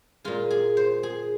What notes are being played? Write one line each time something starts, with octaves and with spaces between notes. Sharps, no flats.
A#2 G#3 F4
G#4
C5
G#4